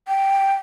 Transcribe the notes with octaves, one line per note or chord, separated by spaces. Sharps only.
G5